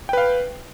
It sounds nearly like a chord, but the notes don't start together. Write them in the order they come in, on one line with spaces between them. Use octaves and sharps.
G5 B4 F5